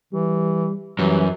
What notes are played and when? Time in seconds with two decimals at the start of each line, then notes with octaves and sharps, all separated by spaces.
0.13 E3 G3
0.99 F#2 E3 G3